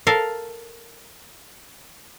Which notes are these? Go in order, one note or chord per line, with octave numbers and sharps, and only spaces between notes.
A4 A#4 F5